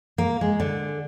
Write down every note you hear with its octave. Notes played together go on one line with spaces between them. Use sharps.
A#3
G#3
D3